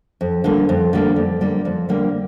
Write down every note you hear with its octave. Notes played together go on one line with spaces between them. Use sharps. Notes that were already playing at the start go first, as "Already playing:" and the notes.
F2
D3 G3 A#3
F2
D3 G3 A#3
F2
D3 G3 A#3
F2
D3 G3 A#3